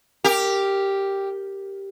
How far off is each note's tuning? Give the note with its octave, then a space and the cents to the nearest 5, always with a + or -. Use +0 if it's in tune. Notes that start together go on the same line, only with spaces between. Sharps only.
G4 +0 A#4 -10